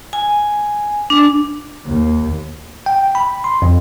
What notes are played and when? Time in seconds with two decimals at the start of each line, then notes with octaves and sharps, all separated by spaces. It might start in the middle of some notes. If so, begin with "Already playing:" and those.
0.13 G#5
1.10 D4
1.86 D#2
2.86 G5
3.15 B5
3.44 C6
3.62 F2